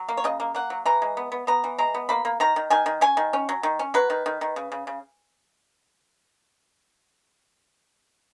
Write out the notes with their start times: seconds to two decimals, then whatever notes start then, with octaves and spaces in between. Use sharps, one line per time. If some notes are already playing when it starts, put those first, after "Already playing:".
Already playing: F#3
0.09 A#3
0.17 C#5
0.24 C#3 D#5
0.40 A#3
0.55 A#3 F#5
0.70 F#3
0.86 E3 A#5
1.02 G#3
1.17 B3
1.32 B3
1.47 B3 A#5
1.64 E3
1.78 G#3 A#5
1.95 B3
2.09 A#3 B5
2.25 A#3
2.40 D#3 A#5
2.56 D#3
2.70 D#3 G#5
2.86 D#3
3.01 C#4 G#5
3.17 D#3
3.33 C#4
3.49 F#3
3.63 D#3
3.79 C#4
3.94 F#3 B4
4.10 D#3
4.26 D#3
4.41 D#3
4.56 C#3
4.72 C#3
4.87 C#3